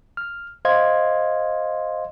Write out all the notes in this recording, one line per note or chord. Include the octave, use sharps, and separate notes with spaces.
F6
C5 D#5 F5 C6 G#6